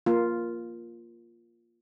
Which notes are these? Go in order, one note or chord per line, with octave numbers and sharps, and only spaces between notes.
A#3 F4